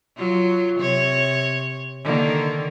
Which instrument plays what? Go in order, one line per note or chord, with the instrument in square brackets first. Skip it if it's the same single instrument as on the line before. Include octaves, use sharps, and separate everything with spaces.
[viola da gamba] F#3 F4
C3 C#5
D3 D#3 A#3